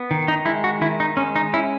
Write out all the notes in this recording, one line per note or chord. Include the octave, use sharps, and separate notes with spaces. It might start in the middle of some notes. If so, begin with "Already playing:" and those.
Already playing: B3
D#3
D#4
G#3 E4
F#4
D#3 E4
D#4
G#3 C#4
D#4
C#4 E4